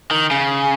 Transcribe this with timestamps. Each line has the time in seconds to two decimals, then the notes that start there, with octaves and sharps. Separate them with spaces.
0.11 D#3
0.31 C#3